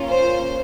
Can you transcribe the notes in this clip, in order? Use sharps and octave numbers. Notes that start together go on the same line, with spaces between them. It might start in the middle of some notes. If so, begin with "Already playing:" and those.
Already playing: A#3 C#4 F4
C5